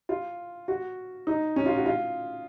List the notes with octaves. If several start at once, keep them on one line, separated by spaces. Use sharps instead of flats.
F4
F#4
D#4
C#4
F4
F#4
F4